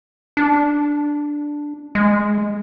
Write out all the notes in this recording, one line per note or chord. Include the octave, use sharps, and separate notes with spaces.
D4
G#3